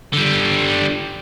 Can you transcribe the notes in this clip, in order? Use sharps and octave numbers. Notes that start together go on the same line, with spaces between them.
D3 G3